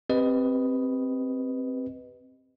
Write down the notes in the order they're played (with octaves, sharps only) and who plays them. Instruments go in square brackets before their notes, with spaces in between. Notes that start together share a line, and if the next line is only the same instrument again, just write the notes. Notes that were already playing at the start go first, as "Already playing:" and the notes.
[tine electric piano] C4 G4 B4 D#5